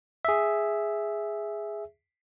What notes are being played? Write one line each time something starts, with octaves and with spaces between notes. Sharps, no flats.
G#4 E5